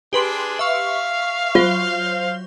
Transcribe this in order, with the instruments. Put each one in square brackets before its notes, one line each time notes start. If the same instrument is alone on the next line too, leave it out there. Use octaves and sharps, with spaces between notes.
[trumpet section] D4 G#4 [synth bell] G4 B4 C6
[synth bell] E5 C#6 [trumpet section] F5
[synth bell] F#3 C5 [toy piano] F4